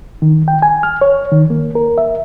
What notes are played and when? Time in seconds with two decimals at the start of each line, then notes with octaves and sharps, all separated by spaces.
0.22 D#3
0.48 G5
0.62 G#5
0.83 F6
1.01 C#5
1.32 D#3
1.50 A#3
1.75 A#4
1.98 E5